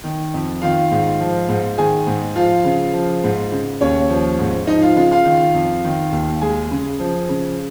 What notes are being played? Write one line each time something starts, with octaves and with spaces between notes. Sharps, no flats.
D#3
F2
D#3 F4 F5
G#2
F3
G#2
D#3 G#4 G#5
G#2
F3 F4 F5
C#3
F3
G#2
C#3
D#2 C#4 C#5
F3
G#2
F3 D#4 D#5
F4 F5
C#3 F4 F5
F4 F5
D#3
F2
D#3
D#2
G#3 G#4 G#5
C#3
F3
C#3